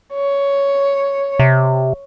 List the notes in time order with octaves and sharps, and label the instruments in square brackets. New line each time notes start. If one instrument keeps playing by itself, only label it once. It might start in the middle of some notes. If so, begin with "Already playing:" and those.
[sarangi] C#5
[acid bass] C3